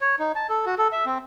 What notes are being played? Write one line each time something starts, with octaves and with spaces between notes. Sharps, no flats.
C#5
D#4
A5
A4
F#4
A4
E5
C4